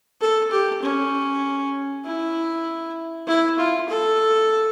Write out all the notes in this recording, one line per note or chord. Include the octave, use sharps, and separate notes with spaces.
A4
G4
C#4
E4
E4
F4
A4